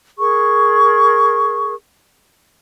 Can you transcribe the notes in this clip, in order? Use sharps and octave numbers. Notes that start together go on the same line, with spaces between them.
G#4 A#4 C#6